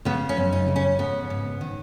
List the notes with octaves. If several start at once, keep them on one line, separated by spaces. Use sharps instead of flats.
C#3 B3
C#4
F#2
D#4
C#3
C#4
G#2 B3
G#2
D#3